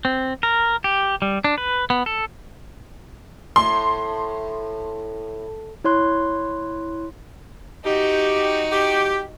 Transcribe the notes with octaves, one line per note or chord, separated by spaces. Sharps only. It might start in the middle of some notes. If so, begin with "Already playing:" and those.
C4
A#4
G4
G3
D4
B4
B3
A4
A2 C6
E4 C#5 C6 F#6
D#4 F#4 G4
G4